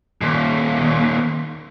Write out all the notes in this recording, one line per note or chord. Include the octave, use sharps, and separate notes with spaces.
D#2 A#2